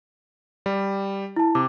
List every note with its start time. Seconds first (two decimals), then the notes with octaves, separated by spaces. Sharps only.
0.66 G3
1.36 E4 A5
1.55 C3 D6